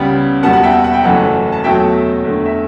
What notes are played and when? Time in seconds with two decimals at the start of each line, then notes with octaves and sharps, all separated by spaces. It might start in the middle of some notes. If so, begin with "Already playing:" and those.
Already playing: C#2 C#3 G3 B3 G5 B5
0.43 E2 B2 G3 B3 F#5 A5
0.53 F#5
0.63 E5 G5
0.84 F#5
0.93 G5
1.03 F#1 F#2 E3 A3 F#5 A5
1.52 A5
1.64 E2 B2 F#3 A3 E5 G5
2.24 E2 D3 A3
2.46 E5